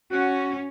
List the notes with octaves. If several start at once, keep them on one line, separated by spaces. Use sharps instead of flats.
C#4 F#4